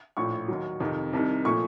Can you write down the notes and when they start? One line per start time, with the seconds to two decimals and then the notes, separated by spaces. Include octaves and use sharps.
0.17 A#1 A2 F3 C#6
0.48 D#2 D#3 F#3
0.80 F2 C3 D#3
1.13 C2 C3 D#3
1.44 A#2 F3 A3 C#6